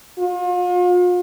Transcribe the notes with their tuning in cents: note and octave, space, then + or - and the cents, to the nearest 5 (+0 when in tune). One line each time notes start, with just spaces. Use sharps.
F4 +40